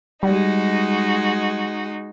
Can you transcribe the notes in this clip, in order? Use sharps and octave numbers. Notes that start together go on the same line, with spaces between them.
G3 G#3 D#4 F#4